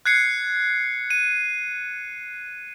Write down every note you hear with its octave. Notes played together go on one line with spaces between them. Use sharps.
F#6 G#6 C7 C#7
D#7